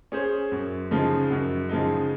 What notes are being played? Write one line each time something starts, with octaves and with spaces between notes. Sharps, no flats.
C#4 G#4 C5
F#2
C#3 F3 G#3 D#4
F#2
C#3 F3 G#3 D#4